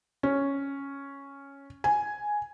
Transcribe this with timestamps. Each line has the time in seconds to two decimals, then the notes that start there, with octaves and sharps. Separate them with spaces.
0.23 C#4
1.84 G#5